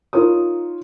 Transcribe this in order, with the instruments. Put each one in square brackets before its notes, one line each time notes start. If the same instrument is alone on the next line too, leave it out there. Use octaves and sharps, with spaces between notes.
[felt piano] D#4 F4 A#4 C#5 D#6